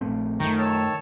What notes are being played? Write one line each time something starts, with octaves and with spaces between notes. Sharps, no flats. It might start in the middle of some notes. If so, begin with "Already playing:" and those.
A#1 A3 C4
F#2 D#3 A3 G5 A#5 C#6
C#5 A5 E6